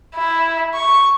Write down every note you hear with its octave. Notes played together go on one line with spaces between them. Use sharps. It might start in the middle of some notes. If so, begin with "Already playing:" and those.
E4
C#6